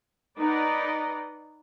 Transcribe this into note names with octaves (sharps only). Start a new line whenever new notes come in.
D#4 B4 D5 D#5 F#5